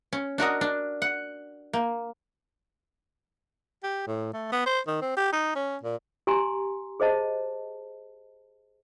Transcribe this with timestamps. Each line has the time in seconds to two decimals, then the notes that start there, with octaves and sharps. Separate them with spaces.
0.13 C#4
0.38 D4 F#4 A#4 D#5
0.61 D4
1.02 F#5
1.73 A#3
3.83 G4
4.07 A2
4.34 A3
4.52 B3
4.66 C5
4.88 D#3
5.01 C4
5.17 G4
5.33 D#4
5.56 C#4
5.83 A#2
6.27 G4 G#5 A#5 C6
7.00 G#4 C5 D#5 A5